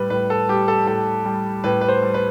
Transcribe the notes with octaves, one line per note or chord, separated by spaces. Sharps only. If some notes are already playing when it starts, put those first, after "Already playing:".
Already playing: A2 G3 B4
A2 B4
A4
G3 G4
A4
A2 A4
G3
A2 B4
B4
C5
G3
B4